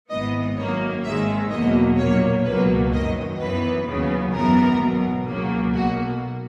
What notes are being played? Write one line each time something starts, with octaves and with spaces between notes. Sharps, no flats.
G#1 G#2 E3 B3 D#5
F#2 D#3 A#3 C#5
G#1 G#2 D#3 G#3 E5
E2 B2 F#3 A#3 D#5
A#1 A#2 F#3 A#3 C#5
C#2 B2 F#3 A#3 B4
F#2 D#3 F#3 D#5
F#2 E3 B3 B4
D#2 C#3 F#3 B3
G#1 F#2 E3 B3 A#4
B1 B2 F#3
C#2 C#3 F#3 A#3
B1 B2 A#3 F#4